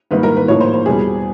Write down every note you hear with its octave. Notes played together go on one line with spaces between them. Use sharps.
G#2 D#3 G3 A#3 B4
A#4
B4
A2 F3 A#3 D#4 C#5
C5
C5
E2 B2 G3 G#4